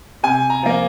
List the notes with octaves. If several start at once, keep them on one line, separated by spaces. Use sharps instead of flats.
C3 G#5
A#5
F3 A#3